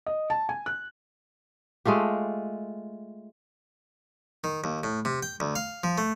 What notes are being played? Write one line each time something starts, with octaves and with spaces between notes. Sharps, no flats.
D#5
A5
G#5
F#6
G#3 A3 F4 G4
D#3
D#2
A2
C3
G5
D2
F5
F3
A3